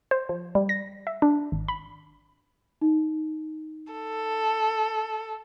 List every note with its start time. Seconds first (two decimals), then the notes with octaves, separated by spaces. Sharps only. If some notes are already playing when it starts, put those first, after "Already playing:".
0.11 C5
0.29 F3
0.55 G3
0.69 A#6
1.07 E5
1.22 D4
1.52 G#1
1.68 B5
2.81 D#4
3.93 A4